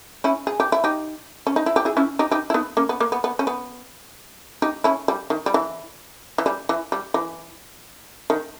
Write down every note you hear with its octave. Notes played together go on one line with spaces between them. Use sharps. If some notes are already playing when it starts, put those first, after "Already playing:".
C#4 E4
G#4
G4
E4
D#4 G4
C#4
D#4
E4
G4
E4 G#4
C#4 E4
D#4 G4
D#4 G4
E4
B3 D#4
A#3 C#4
B3
A#3
B3
B3
C#4
B3
D#4 G4
C#4 E4
G3
D#3
G3
E3
E3
G3
E3
G3
E3
D#3